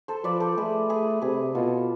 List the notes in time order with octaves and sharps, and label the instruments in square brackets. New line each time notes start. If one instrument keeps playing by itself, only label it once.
[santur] A4 C5
[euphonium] F3 [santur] B4 D5
[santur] A4 C5
[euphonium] A3 [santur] G#4 B4
[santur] G#4 B4
[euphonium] C3 [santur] G#4 B4
[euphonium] B2 [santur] F4 A4